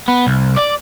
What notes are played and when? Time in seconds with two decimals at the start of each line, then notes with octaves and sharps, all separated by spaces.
0.08 B3
0.27 C2
0.56 D5